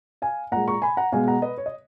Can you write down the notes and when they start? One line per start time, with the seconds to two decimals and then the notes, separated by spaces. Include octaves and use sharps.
0.22 F5 G#5
0.52 A#2 G#3 F#5 A#5
0.68 A#5 C#6
0.82 G#5 B5
0.97 F#5 A#5
1.12 B2 G#3 F5 G#5
1.27 F#5 A#5
1.42 B4 D#5
1.58 C#5
1.66 D#5